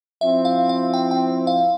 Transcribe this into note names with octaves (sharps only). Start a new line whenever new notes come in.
F3 C4 E4 E5
F5
F5
G5
G5
F5